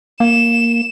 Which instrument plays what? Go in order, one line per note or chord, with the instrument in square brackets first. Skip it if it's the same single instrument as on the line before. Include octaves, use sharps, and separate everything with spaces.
[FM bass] A#3 [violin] E7